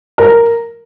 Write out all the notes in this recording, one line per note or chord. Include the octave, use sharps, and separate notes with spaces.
A#4